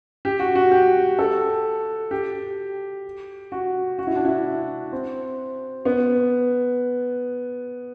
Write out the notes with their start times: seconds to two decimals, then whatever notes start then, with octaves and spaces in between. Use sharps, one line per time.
0.25 G4
0.39 F#4
0.55 F#4
0.71 G4
1.19 A4
2.11 G4
3.52 F#4
3.99 F#4
4.07 E4
4.16 D4
4.25 E4
4.92 C4
5.85 B3